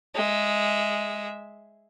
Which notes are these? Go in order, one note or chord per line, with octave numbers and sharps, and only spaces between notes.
G#3 E5